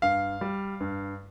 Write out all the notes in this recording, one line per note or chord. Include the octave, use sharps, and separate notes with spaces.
G2 F5
G3
G2